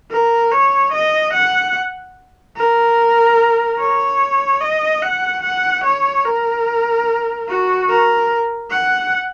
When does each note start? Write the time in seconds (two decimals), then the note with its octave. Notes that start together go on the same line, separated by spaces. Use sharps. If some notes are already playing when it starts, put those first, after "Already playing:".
0.11 A#4
0.52 C#5
0.93 D#5
1.33 F#5
2.56 A#4
3.79 C#5
4.61 D#5
5.02 F#5
5.43 F#5
5.84 C#5
6.25 A#4
7.48 F#4
7.89 A#4
8.71 F#5